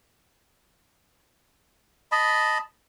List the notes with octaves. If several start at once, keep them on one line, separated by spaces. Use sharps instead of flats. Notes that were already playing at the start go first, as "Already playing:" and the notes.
D#5 A5 B5